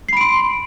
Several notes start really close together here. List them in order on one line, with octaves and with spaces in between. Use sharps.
C7 B5 D7 C6